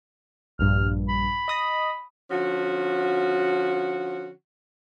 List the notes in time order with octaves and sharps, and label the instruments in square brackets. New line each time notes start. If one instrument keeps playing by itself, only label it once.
[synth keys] A#1 G2 [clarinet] F6
[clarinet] B5
[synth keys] D#5 D#6 A#6
[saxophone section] D3 F3 C#4 F#4